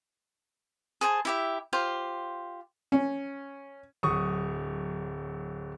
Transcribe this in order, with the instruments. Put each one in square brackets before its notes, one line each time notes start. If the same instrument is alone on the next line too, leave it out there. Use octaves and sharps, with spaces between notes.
[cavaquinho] G#4 C5 G#5 A5
E4 G4 E5
F4 G4 C5
[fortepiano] C#4
[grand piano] D1 F#3 C#6 D#6